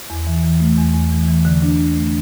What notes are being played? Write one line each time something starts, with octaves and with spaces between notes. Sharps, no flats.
E2
E3
E3
A3
E2
E2
E3
E3
D3
D4
E2
A3